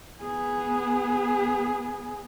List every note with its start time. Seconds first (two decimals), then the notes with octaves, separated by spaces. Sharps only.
0.21 B3 G#4